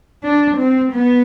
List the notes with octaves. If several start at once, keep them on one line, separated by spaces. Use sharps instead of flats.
D4
C4
B3